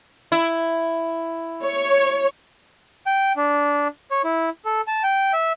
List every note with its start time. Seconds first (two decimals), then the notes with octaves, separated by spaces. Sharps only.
0.32 E4
1.63 C#5
3.06 G5
3.36 D4
4.11 C#5
4.24 E4
4.65 A4
4.87 A5
5.04 G5
5.33 E5